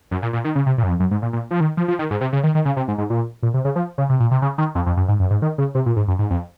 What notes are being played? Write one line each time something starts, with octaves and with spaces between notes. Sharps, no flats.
F#2
A#2
A#2
D#3
C#3
C3
A#2
F#2
F2
F#2
G#2
A#2
A#2
F3
D#3
F3
F3
D#3
G#2
C3
C#3
D#3
D#3
C#3
C3
G#2
G#2
A#2
A#2
C3
C#3
F3
C#3
C3
A#2
C3
C#3
D#3
F2
F2
F#2
G#2
F#2
G#2
D#3
C#3
C3
A#2
G#2
F#2
G#2
F2